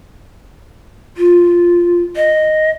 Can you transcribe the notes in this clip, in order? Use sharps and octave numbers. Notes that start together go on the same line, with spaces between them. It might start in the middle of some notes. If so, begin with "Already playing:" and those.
F4
D#5